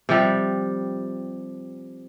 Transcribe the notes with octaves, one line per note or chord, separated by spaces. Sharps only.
C3 F3 G3